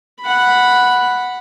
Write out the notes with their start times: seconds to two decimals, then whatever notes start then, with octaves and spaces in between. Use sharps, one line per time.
0.21 F#5 B5